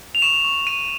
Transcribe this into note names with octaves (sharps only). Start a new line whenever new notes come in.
F7
C#6 E7
C#6
C#6 D#7